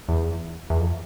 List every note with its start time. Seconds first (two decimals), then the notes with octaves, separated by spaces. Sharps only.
0.09 E2
0.70 E2
0.80 F2